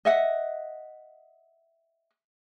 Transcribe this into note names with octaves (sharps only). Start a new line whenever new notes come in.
D#5 E5 F#5